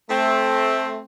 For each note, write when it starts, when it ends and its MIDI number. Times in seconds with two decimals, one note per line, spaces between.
0.10 1.03 57
0.10 1.03 60